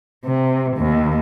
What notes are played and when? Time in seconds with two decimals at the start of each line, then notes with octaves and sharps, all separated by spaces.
0.24 C3
0.77 D#2